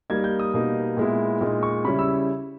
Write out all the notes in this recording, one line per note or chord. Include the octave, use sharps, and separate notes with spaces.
G3 A#3 D#4 G#6
G6
D#6
B2 G3 A#3 D#4
A#2 G#3 B3 E4
A#2 G#3 D#4
C#6
C#3 G3 C#4 E4 B5
E6